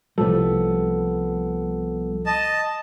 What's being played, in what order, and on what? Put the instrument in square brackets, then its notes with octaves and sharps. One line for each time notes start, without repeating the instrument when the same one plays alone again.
[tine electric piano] C2 F3 A4 [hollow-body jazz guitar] G3 A3 B3
[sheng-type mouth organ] D#5 A5